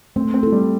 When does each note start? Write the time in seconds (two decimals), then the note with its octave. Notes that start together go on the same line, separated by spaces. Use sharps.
0.16 A3 C4
0.34 C4
0.43 E4 A4
0.52 G3